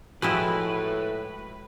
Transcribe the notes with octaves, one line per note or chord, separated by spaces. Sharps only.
A2 F3 G#3 E4 F#4 B4 G5 E6